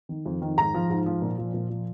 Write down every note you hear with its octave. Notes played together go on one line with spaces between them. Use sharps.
D#3
F2
D#3
G#2 A#5
F3
G#2
F3
A#2
F3
A#2
F3